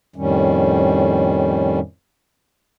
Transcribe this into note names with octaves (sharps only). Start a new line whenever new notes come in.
F2 A2 D#3 G3 C#4